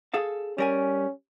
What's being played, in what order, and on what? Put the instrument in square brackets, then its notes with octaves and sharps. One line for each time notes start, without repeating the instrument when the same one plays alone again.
[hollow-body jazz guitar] G#4 A4 F5
[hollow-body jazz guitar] G3 A#4 G#5 [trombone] C#4